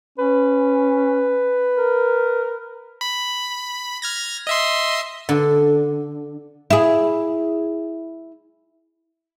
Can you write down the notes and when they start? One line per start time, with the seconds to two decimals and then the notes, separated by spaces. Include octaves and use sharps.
0.18 C#4 B4
1.78 A#4
3.01 B5
4.02 F6 G#6 A#6
4.47 D#5 E5 C6
5.29 D3
6.70 E4 G#4